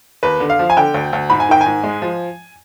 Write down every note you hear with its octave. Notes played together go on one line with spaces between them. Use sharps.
D#2 B4
D3
F5
F3
G#5
D3 G5
D2
D2
G#2 B5
G#5
D#3 G5
G#5
G#2
G#3
F3